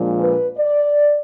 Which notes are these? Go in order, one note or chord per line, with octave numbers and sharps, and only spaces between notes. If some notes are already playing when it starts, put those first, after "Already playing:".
Already playing: A#2 F3 G#3 D4
B4
D5